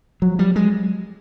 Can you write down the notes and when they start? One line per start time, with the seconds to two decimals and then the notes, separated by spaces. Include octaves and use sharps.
0.22 F3 F#3
0.39 G3
0.45 F#3
0.56 G#3